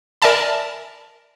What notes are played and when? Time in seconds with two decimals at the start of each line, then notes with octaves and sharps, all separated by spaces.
0.22 A#4 D5 E5 G#5 A5 B5